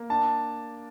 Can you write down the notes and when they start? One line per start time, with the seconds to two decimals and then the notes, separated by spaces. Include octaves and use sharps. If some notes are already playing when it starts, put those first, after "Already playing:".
Already playing: A#3
0.10 D4 A5